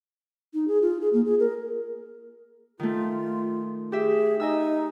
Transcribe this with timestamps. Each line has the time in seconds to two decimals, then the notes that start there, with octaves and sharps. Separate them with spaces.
0.53 D#4
0.67 G#4
0.82 F4
1.01 G#4
1.13 A#3
1.25 G#4
1.39 A#4
2.80 D#3 A3 F4
3.92 G4 G#4 E5
4.40 D#4 D#5 G#5 E6